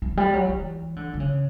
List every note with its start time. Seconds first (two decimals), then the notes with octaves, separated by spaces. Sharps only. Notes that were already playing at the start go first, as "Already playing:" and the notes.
0.02 E3
0.17 G3
0.33 F#3
0.49 E3
0.96 D3
1.14 D3
1.20 C#3